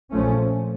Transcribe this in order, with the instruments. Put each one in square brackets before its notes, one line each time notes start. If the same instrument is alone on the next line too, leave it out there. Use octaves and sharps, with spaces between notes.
[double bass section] A#1 A#2 F3 A3 C#4